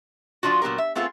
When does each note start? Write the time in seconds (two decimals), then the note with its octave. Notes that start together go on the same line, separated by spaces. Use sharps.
0.43 F3 A#3 D4 F4 F#4
0.62 A#2 F#3 B3 G4 A#4
0.78 E5
0.95 A3 B3 C4 F4 G#4 A4